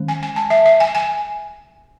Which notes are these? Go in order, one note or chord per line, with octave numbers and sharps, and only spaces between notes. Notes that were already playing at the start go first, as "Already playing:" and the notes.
Already playing: D#3 G#3 C#4
G#5
G#5
A5
E5
E5
G#5
G#5